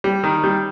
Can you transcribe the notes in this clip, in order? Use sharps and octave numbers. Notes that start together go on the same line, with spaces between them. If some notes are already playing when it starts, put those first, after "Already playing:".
G3
D#3
G3